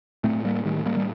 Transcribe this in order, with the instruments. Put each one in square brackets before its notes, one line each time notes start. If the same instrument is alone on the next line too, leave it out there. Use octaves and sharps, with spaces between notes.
[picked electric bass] A2 A3 C4
G3 A#3
A2 D#3 G3
G3 A#3
G3